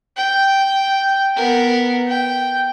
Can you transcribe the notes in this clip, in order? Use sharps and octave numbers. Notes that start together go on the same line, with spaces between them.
G5
B3 A#4
G5